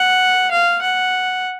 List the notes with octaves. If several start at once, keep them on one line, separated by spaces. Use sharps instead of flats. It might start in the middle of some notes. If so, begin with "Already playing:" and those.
Already playing: F#5
F5
F#5